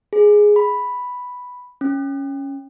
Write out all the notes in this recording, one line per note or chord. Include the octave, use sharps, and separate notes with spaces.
G#4
B5
C#4